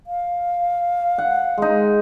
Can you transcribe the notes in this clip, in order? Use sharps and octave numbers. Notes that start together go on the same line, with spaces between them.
F5
F#5
G#3 D#4